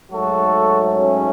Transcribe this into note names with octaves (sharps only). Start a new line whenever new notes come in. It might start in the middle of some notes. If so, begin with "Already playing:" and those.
G#2 F#3 A3 F#4 A4
C#4